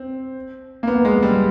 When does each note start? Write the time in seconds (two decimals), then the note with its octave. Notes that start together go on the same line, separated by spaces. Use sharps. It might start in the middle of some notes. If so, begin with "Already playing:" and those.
Already playing: C4
0.83 A#3
0.87 B3
1.05 G#3
1.22 G3